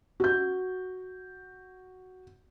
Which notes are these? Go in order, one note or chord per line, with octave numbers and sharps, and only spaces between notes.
F#4 G6